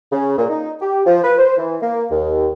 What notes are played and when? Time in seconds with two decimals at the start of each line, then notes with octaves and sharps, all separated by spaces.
0.12 C#3
0.37 A#2
0.50 D#4
0.81 G4
1.06 F3
1.24 B4
1.38 C5
1.57 E3
1.82 A#3
2.11 D#2